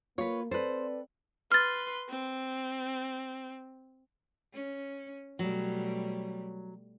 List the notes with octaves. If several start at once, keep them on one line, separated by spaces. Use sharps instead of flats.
A#3 F4 B4 C#5
C4 A4 B4 C5 D5
B4 C6 F6 A6
C4
C#4
B2 F#3 G3 A3